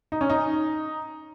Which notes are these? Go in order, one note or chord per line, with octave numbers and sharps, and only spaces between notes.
D#4
C#4
D#4